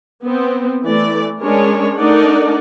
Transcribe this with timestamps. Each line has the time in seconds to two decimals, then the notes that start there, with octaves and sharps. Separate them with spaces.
0.23 B3 C4
0.84 E3 A3 D5
1.42 G#3 C#4 D4 A#4 C#5
1.98 A3 D4 D#4 A#4 D5 F#5